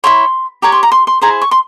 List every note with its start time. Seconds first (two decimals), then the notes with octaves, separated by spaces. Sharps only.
0.04 E4 A#4 C#5 C6
0.62 G4 C#5 A#5
0.72 C6
0.83 A#5
0.92 C6
1.07 C6
1.22 E4 G#4 C5 A#5
1.42 C#6
1.51 C6